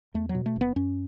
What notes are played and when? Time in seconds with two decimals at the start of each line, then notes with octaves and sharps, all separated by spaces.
0.14 E2 A3
0.29 F#3
0.35 B2
0.46 A3
0.56 F#1
0.61 B3
0.76 F#2 C#4